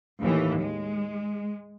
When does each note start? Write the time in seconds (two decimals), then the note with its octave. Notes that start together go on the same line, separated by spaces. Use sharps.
0.20 D#2 A2 E3
0.58 G#3